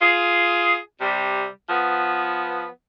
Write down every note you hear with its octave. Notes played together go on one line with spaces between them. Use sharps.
F4 G#4
C3 G3
F3 B3